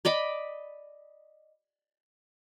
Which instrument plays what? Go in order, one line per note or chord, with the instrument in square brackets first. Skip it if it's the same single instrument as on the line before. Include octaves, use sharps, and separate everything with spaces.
[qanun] D5 D#5 B5 D6